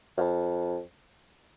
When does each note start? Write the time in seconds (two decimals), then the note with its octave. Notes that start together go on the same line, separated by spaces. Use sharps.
0.17 F#2
0.21 F2